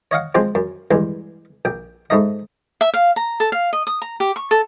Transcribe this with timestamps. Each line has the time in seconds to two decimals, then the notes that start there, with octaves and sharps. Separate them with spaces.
0.11 C#5 D#5 F5 F#5
0.35 F3 G#3 C4 F4
0.55 F#2
0.91 E2 G2 G#3
1.65 A#1 G5
2.10 G#2 A3 D#4 D#5
2.81 E5
2.94 F5
3.16 A#5
3.40 A4
3.52 F5
3.73 D#5
3.87 D#6
4.02 A#5
4.20 G4
4.36 C#6
4.51 A4